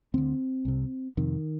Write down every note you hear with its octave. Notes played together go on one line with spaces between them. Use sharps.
D2 D3 C4
C2 C3
F2 C3 D#3